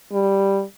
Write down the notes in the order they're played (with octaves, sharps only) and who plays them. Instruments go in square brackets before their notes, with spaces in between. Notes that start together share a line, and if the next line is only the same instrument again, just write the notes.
[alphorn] G3